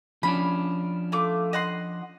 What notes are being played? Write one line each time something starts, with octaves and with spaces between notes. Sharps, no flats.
F3 C#4 D4 B5
A3 F4 D6
D#5 F#5 C6